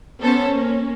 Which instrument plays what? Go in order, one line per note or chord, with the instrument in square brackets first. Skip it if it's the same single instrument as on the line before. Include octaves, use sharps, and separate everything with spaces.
[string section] B3 A4 C5 [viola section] C#4
[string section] A#3